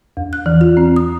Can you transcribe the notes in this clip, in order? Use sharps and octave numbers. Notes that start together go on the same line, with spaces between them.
E2
F#6
E3
F4
C4
D#6